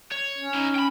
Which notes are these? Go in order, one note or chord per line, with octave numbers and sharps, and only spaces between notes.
C#5
C#4
D#4 E4
G5 B5